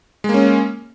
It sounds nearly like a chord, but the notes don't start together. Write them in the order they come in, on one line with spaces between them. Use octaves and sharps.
G#3 A#3 C#4